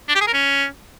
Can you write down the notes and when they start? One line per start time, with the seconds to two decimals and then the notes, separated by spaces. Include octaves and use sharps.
0.08 D4
0.15 G4
0.21 G#4
0.27 A#4
0.33 C#4